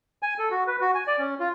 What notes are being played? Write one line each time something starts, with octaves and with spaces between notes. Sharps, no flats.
G#5
A4
F#4
B4
F#4
G#5
D5
C#4
F4